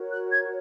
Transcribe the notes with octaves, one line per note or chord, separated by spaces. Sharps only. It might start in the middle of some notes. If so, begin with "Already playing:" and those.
Already playing: F#4 A#4 C#5
F#6
G#6